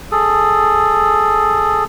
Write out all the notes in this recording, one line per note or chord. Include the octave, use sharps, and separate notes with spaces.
G#4 A4